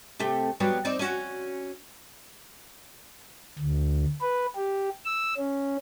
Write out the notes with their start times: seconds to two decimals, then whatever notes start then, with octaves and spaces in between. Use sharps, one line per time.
0.19 C3 A3 G4
0.60 F#3 G3 B3
0.85 C4 D#4 D5
0.99 C#4 F#4
3.58 D2
4.21 B4
4.56 G4
5.05 E6
5.38 C#4